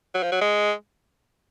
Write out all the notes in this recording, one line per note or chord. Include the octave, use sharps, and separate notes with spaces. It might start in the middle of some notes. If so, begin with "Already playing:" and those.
F#3
F3
F#3
G#3